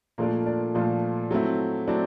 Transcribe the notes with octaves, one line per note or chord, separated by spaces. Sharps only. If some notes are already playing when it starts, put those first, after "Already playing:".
A#2 F3 A3 A#3 D4 F4 A#4
D4 D5
A#2 F3 A3 D4 F4
F#3 A3 C4 E4
F#3 A3 C4 D4 E4 D5